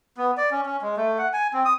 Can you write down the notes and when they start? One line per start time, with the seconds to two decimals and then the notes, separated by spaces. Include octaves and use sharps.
0.17 B3
0.37 D5
0.51 C#4
0.66 C#4
0.82 G#3
0.97 A3
1.18 F#5
1.33 G#5
1.53 C4
1.65 D#6